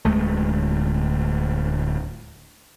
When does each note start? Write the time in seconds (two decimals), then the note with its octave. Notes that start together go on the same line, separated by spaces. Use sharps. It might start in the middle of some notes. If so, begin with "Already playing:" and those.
0.05 D1 D2 G#3 A3